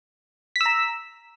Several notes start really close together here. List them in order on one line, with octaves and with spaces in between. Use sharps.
B6 E6 A#5